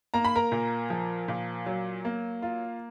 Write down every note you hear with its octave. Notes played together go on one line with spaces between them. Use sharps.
A#3 A#5
B5
A#4 A#5
A#2
F3
A#2
F#3
A#3
F4